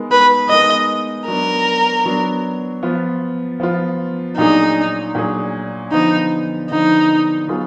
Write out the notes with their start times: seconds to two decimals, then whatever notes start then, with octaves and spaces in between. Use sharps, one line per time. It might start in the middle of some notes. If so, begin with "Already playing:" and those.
Already playing: G#3 B3 D#4 A#4
0.12 B4
0.49 G#3 B3 D#4 A#4 D#5
1.28 F#3 B3 D4 A#4
2.05 F#3 B3 D4
2.83 F3 B3 F4
3.60 F3 B3 F4
4.37 A#2 F#3 D4 D#4 G#4
5.15 A#2 F#3 D4 G#4
5.92 D3 F3 B3 D#4
6.70 D3 F3 B3 D#4
7.48 F#3 B3 F4 G#4